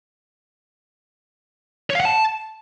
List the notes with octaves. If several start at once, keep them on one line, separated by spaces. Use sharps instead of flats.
C#5
F5
F#5
A5